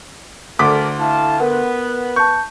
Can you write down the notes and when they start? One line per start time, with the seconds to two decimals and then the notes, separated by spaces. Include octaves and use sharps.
0.59 D2 A4 A#4 D5 D6 B6
0.98 E4 F5 A5
1.40 B3 A#4 B4 F#5
2.16 A5 C#6 G6